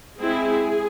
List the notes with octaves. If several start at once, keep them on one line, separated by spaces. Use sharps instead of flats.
G#3 C4 E4 G#4